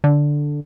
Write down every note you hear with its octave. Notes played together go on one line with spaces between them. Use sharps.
D3